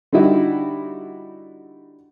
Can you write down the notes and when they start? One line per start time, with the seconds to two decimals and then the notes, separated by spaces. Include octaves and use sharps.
0.12 D3 G3 D#4 E4 F#4